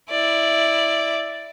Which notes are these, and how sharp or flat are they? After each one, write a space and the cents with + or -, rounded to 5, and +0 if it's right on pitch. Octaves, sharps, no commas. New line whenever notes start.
E4 +0 D5 +0